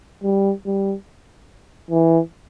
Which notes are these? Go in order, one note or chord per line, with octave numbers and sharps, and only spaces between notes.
G3
G3
E3